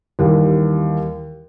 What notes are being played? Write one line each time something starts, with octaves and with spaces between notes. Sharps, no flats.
D#2 E3 G3